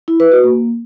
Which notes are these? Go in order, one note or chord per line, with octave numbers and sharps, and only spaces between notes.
E4
B4
F#4
A#3